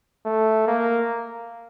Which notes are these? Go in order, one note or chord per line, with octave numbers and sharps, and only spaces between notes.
A3
A#3